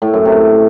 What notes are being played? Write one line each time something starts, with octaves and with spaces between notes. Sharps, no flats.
A2
F#2
C3